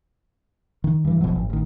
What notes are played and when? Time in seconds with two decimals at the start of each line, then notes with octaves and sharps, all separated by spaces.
0.84 D#3
1.05 G2 E3
1.21 F1 B2 F3 F#3
1.35 G#1
1.50 A1 D#3